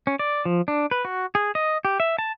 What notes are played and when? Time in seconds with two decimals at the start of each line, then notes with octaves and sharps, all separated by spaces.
0.07 C#4
0.19 D5
0.45 F3
0.68 D4
0.91 B4
1.05 F#4
1.35 G#4
1.55 D#5
1.85 G4
2.00 E5
2.19 A5